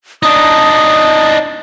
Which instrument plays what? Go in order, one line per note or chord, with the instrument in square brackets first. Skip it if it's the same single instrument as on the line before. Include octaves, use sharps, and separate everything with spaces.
[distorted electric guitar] D4 D#4 [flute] D#6